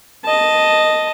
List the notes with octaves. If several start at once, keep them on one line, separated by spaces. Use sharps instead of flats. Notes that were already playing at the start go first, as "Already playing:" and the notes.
D#5 A5